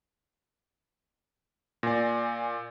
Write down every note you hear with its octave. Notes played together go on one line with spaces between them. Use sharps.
A#2 D5 G#5 A#6